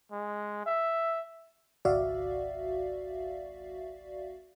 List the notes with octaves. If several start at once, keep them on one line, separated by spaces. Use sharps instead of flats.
G#3
E5
G#1 C#2 F#4 D5 E5 F5